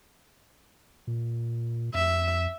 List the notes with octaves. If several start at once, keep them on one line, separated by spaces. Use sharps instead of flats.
A#2
F2 E5